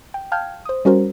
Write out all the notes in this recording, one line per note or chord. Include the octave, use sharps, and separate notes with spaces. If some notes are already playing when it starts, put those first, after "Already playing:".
G5
F5 G5 A5 F6 G6 G#6
C5 D#6
G3 C#4 F#4 A#4 C5